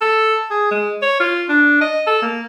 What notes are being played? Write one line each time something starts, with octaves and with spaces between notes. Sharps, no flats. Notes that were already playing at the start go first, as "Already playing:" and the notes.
A4
G#4
G#3
C#5
F4
D4
D#5
A4
A#3